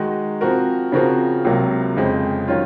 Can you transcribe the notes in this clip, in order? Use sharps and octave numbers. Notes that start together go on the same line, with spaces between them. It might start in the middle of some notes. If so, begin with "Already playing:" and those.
Already playing: D#3 G#3 D#4 F#4
F3 C4 F#4 A#4
C#3 F3 C4 F#4 A#4
C#2 C3 F#3 A#3
F2 C#3 G#3 C4
D#3 F#3 C#4 F4